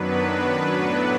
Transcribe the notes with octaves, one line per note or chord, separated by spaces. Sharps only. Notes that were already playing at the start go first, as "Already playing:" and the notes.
Already playing: F#2 D#3 F#3 B3 D4 B4
A2 F#3 B3 D4